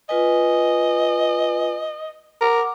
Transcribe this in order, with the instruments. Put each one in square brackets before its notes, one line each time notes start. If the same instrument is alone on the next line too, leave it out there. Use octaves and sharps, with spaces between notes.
[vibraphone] F4 B4 G#5 [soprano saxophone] D#5
[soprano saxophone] A#4 [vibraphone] F#5 D6